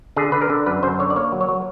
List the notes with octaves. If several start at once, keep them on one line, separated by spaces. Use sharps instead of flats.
D3 G#4
D3 B4
A#4
D3
F#2 B4
F#2 C5
D3 C#5
D5
A#3 C#5
F#3
C#5
F#3